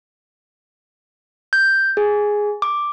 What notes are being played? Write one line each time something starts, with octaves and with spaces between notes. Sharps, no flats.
G6
G#4
D6